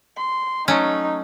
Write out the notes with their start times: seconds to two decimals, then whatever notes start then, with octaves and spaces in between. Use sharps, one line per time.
0.17 C6
0.68 F#3 A3 C#4 D#4